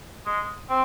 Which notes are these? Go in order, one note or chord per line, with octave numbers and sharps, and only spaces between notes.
G#3
C4